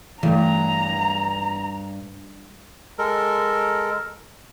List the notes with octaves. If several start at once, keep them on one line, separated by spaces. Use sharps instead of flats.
G2 E3 A3 A#5
G#3 A4 A#4